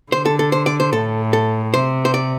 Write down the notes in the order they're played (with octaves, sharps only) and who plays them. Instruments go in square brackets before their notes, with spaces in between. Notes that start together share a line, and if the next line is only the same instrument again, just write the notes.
[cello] D3 [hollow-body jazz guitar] C5
[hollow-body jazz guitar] A4
A4
C5
D5
C5
[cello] A2 [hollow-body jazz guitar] A4
[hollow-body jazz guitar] A4
[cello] C3 [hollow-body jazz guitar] C5
[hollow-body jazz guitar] C5
D5